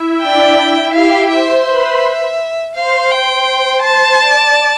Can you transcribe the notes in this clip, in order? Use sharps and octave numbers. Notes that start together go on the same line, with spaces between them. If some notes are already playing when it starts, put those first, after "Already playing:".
Already playing: E4 E5
D4 D5 G5
E4 E5
G4 F5 G5
C5 E5 C6
B4 E5 B5
C5 F5 C6
G5
C5 C6
A5
D5 D6